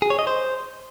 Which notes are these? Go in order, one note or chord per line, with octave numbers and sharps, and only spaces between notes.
G#4
C#5
D#5
C5